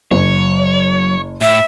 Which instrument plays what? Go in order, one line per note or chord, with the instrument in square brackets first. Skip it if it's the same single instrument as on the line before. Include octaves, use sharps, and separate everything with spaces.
[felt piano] F#1 [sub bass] F#3 [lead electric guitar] C#5
[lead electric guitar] A2 [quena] E5